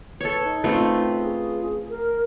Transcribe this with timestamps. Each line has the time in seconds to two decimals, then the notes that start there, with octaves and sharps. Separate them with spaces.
0.20 A4 B4 C#5
0.44 D#4
0.64 A3 C4 C#4 F4 B4
1.18 G#4
1.90 A#4